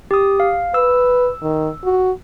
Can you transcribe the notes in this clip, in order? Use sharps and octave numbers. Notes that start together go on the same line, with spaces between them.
G4 D#6
F5
B4 E6
D#3
F#4